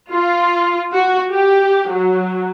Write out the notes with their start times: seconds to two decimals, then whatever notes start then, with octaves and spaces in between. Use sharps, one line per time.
0.11 F4
0.93 F#4
1.32 G4
1.90 F#3